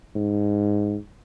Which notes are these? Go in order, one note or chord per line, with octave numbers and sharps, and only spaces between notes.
G#2